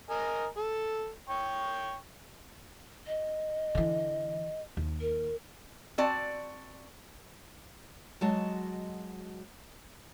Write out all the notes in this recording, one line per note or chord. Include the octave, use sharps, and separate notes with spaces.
A#4 D#5 G#5
A4
C#5 G5 C#6
D#5
D3 E3
D#2
A#4
C4 F#4 D5 A5
F#3 G#3 F#4 D#5 A5